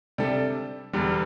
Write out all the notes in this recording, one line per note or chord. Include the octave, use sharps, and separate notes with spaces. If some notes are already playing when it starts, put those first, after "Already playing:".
C3 G3 D4 A4
E1 E2 D3 G3